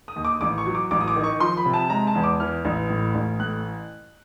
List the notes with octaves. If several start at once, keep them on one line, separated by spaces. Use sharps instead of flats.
D#6
D#2
D6
A1 D6
C#6
F#3
D6
A1 D6
D#6
D6
D#3
C#6
F3 C6
B5
C3
A5
G#3 A#5
A5
E2
D6
E3 F6
A1
A2
A1
A2 F#6